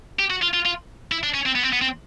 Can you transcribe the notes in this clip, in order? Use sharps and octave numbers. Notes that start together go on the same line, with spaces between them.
G4
F#4
F4
F4
F4
E4
D4
C#4
C4
B3
C4
B3
C4